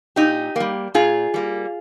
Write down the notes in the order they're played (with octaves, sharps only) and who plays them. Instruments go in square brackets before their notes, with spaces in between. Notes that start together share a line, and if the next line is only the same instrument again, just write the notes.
[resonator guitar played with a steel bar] A#2 D#4 G4
G3 A#3
A#2 F4 G#4
G3 A#3